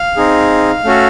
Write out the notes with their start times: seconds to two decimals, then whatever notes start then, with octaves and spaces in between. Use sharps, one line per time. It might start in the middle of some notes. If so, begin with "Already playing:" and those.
Already playing: F5
0.17 C4 D#4 G#4
0.85 A3 C#4 F#4 A4